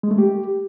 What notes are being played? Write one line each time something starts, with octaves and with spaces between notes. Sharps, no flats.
G#3
A3
G4